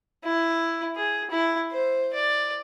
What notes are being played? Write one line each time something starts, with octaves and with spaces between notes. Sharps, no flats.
E4
G#4
E4
C5
D5